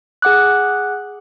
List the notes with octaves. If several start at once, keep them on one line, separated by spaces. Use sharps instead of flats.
G#4 F#5 D6 F#6